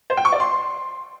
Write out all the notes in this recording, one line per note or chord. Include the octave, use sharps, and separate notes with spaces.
C5
G5
C#6
D5
C6